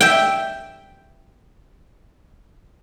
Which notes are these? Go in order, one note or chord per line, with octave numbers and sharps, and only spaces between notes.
E5 G5